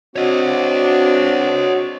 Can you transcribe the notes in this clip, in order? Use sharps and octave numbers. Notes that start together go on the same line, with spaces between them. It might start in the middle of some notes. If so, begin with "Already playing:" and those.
C4 D4 F#4 C#5 D#5